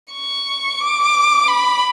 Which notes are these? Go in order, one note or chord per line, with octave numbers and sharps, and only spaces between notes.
C#6
D6
B5